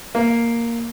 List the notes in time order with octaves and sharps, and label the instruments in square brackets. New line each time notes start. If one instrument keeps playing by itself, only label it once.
[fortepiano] A#3